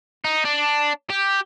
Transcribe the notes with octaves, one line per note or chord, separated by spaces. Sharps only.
D#4
D4
G4